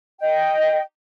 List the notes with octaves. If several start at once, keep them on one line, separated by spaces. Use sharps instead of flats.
D#5 G5